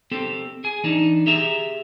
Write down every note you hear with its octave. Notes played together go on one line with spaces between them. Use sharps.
C4 G4 A4
G#4 G#5
E3 D4 D#4
G4 G#4 E5 A#5